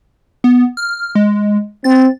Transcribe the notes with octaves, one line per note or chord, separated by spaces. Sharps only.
B3
F6
G#3
C4 A6